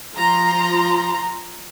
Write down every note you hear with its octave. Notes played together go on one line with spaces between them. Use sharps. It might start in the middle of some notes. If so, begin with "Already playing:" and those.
F3 F4 A#5 C6